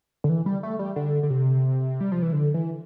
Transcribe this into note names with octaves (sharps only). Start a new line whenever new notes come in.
D3
E3
G3
A3
G3
D3
D3
C3
G3
F3
E3
D3
E3